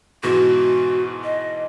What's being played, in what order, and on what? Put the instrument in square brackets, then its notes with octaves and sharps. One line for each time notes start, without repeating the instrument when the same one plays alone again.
[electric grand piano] G#2 B2 E3 [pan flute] F#4
[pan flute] D#5